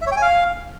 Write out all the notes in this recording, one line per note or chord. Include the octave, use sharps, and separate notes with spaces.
E5
C#5
G5
G#5
F5